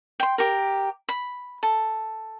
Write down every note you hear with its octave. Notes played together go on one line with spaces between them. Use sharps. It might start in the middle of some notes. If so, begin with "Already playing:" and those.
G5 C6
G4 A#4
B5
A4